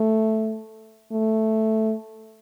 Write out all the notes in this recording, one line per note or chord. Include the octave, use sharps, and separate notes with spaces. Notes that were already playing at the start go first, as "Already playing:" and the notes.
Already playing: A3
A3